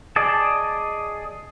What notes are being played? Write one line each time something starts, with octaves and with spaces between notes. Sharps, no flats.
G#4 D5 D#5 A5